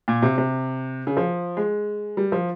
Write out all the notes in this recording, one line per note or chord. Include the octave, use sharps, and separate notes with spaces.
A#2
C3
C3
C#3
F3
G#3
G3
F3